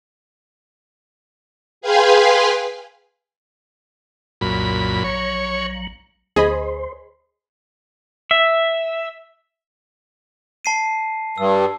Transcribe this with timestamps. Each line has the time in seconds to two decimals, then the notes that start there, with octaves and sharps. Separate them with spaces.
1.81 G#4 B4 F5 G5 G#5 C6
4.41 C2 F#2 A#2 B5
5.04 A#1 F#3 C#5
6.36 D2 G#4 C5 D#5 B5
8.31 E5
10.65 A5 C7 D#7
11.38 G2 E6